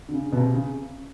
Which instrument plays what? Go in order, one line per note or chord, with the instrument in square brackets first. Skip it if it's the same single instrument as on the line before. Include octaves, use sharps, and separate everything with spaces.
[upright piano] D3
C#3
B2
C3
C#3